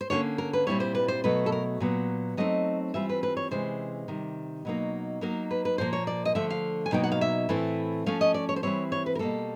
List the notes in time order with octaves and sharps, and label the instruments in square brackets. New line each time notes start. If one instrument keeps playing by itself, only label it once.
[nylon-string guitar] C5
D3 G3 A#3 C#4 C#5
A#4
B4
A#2 G3 C4 E4 C#5
C5
B4
C5
B2 F#3 A3 B4
A4
A#4
A#2 F#3 B3
F#3 A3 C4 D#4 D#5
E3 G3 C4 F4 E5
B4
B4
C#5
C3 E3 G#3 C#4 C5
C3 D#3 G3
B2 F#3 A#3 D#4
F#3 A#3 D#4 A#4
B4
B4
A#2 F3 A#3 C5
C#5
D5
D#5
D3 F3 A3 E5
F5
G#5
B2 F#3 A#3 D#4 G5
F#5
F5
E5
A2 E3 A3 C4 E4
F3 A3 C#4 F5
D#5
D5
C#5
C5
E3 G3 C4 E4 C#5
C#5
B4
A#4
B2 G3 A#3 A4